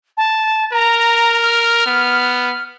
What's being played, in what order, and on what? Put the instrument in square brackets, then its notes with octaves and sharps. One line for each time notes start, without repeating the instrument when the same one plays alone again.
[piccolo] A5
[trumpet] A#4 [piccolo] A#5
[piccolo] F6
[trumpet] B3